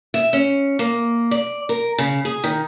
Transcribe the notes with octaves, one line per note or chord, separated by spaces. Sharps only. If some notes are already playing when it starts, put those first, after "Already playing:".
E5
C#4
A#3
D5
A#4
C#3
G#4
D#3